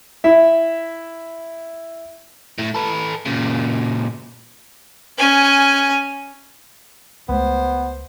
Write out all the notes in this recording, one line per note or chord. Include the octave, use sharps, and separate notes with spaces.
E4 E5
A2 A3
A4 B4
A#2 C#3
C#4 G#5
C#2 A3 B3 C5